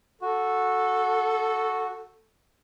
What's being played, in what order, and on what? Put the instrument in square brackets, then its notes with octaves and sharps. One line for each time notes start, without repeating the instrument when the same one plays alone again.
[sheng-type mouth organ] F#4 [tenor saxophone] A4